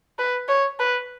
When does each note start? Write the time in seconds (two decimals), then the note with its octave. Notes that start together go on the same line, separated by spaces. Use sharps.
0.19 B4
0.49 C#5
0.80 B4